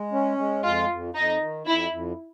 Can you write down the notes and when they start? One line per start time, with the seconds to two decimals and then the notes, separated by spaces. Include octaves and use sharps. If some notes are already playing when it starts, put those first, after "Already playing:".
Already playing: G#3
0.12 C#4
0.38 G#3
0.63 F2 F4
0.89 F2
1.14 F2 D#4
1.40 D#3
1.66 F2 E4
1.91 F2